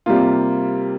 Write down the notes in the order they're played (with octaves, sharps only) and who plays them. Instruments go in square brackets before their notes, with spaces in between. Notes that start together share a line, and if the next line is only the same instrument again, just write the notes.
[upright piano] C3 G3 A#3 F4